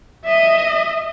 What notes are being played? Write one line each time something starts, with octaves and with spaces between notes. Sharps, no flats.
D#5 E5